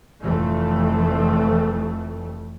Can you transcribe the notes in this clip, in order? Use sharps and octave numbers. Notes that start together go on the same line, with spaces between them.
F1 F2 E3 A3